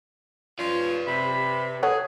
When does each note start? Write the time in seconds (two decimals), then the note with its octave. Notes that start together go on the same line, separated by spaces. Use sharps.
0.59 F3 C#4 F4 B4 D5
1.07 C3 B5
1.83 G#4 A4 C#5 F#5